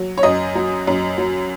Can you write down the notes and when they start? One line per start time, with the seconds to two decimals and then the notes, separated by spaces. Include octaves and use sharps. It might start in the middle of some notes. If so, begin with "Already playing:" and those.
Already playing: F#3
0.18 C#5
0.23 F#2 D#5
0.55 F#3
0.87 F#2
1.18 F#3